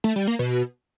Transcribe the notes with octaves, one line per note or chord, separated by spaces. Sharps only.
A3
G3
A#3
B2